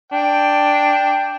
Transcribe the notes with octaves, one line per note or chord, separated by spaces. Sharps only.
D4 G5